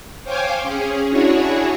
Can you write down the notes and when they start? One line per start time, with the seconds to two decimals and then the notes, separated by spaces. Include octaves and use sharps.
0.24 C5 C#5 F5 G5 G#5 D6
0.63 C#4 G#4
1.09 D4 E4 F#4 G#4 C#5